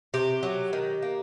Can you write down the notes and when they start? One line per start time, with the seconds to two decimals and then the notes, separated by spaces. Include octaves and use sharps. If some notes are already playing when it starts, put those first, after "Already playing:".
0.14 C3 G4
0.43 F#3
0.73 D#3
1.02 A#3